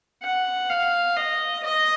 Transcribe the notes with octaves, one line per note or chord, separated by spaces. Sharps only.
F#5
F5
D#5
D#5